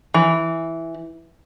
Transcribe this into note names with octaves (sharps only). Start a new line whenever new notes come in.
E3